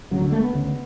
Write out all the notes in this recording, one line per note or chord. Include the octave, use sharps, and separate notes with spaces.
D2 C#3 F#3
D3
A3
B3
D2 C#3